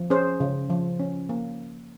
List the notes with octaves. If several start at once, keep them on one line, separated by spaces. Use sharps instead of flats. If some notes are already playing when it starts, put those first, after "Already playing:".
Already playing: F3
C#4 G#4 C5
C#3
F3
C#4
A#3